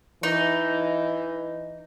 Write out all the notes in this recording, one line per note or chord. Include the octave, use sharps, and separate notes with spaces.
E3 D#4